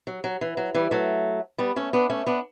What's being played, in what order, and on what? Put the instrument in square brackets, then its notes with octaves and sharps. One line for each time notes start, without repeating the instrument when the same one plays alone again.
[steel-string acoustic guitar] F#3
F#3
E3
F#3
E3 G3
F#3 A3
G3 B3
A3 C#4
B3 D4
A3 C#4
B3 D4